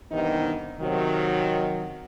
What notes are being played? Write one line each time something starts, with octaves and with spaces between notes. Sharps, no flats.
G2 C3 D#3 E3 B3 D#4
C3 D#3 F#3